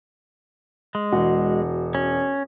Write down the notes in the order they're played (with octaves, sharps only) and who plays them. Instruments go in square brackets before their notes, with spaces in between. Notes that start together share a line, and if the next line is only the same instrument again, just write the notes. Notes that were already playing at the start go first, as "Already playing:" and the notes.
[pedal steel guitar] G#3
[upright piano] E1 F#4
[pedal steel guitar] C#4